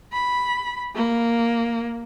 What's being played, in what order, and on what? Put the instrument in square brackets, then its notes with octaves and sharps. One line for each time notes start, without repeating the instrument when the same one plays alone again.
[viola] B5
A#3